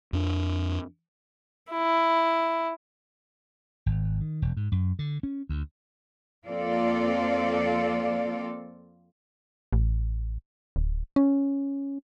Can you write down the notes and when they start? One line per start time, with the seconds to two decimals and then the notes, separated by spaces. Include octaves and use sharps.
0.13 F2 D4
1.71 E4
3.86 G#1
4.21 D#3
4.42 E1
4.57 G#2
4.72 F#2
4.99 D3
5.23 C#4
5.49 D2
6.46 F2 A#3 C4 F4 A4 D5
9.73 A1
10.76 D1
11.16 C#4